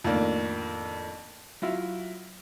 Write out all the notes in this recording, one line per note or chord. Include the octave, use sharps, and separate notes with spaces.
F2 A2 D#3 A#3 D4
F#3 E4 F4